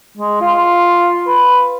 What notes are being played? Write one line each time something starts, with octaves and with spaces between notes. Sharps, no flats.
G#3
F4
B4